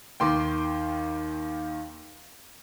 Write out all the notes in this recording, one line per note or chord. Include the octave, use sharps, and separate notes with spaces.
D#2 D#3 G5 C6 D6